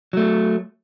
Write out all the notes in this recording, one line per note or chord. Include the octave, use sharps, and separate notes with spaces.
F#3 A3